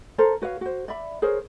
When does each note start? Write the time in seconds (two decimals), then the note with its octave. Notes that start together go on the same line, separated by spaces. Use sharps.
0.18 A4 A#4 C5 A#5
0.42 F#4 B4 C#5 F5
0.61 F#4 C5
0.88 D5 E5 B5
1.22 G#4 A#4 C5 C#5